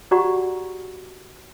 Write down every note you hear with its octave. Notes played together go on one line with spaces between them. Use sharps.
F#4 G4 D5 F#5 A#5 C#6